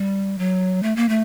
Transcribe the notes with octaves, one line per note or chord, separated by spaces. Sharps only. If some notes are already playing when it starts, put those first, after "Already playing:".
Already playing: G3
F#3
A3
A#3
A3